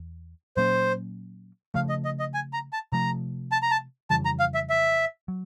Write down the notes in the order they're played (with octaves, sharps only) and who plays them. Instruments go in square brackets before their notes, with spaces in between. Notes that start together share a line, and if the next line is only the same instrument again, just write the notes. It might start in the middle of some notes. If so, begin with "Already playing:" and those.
Already playing: [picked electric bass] E2
[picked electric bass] A#2 F#3 A#3 C#4 [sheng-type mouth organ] C5
[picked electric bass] C#3 F3 A3 [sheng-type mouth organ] F5
[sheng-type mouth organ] D#5
D#5
D#5
G#5
A#5
A5
[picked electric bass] C3 F3 A3 [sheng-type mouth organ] A#5
[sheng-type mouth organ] A5
A#5
A5
[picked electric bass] F2 C#3 E3 G3 [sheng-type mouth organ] A5
[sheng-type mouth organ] A#5
F5
E5
E5
[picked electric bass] F#3